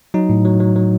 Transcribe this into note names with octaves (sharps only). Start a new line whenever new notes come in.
F#3 D#4
A2
F#3
F#3
F#3